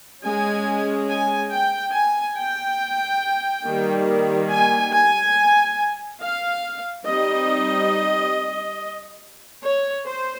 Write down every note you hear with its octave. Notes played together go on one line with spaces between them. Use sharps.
G#3 C#4 G#5
G#5
G5
G#5
G5
D#3 G3 A#3
G#5
G#5
F5
G3 C4 D#4 D#5
C#5
C5